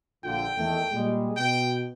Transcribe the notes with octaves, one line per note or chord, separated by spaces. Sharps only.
A#1 D3 F4 G5
E2 D#3 A3
A#2 G3 G#3
B2 G5